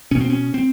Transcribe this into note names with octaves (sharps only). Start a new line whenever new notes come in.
B2 C#4
C4
C#4
C4